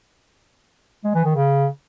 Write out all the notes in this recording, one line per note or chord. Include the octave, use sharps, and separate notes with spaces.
G#3
E3
D#3
C#3